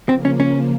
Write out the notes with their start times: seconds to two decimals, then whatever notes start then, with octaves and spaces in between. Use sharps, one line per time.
0.09 C#3 F3 A#3 C4
0.25 C#4
0.40 C#4